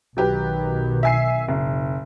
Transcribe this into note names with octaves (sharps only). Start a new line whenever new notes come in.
B1 D#3 F#3 G4 B4
E5 G#5 C7
F#1